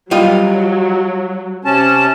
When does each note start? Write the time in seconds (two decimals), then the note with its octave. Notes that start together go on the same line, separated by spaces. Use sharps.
0.11 F#3 G3 F4 D#5
1.65 C3 C#4 A5